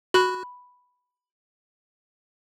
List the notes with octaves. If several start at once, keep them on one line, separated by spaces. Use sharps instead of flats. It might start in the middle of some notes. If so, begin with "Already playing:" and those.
F#4 B5 F#6